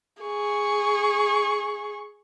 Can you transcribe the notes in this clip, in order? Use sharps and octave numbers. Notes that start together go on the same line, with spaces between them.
G#4 C#6